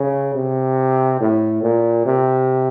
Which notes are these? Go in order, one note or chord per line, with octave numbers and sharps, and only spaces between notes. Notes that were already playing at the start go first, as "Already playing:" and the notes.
Already playing: C#3
C3
A2
A#2
C3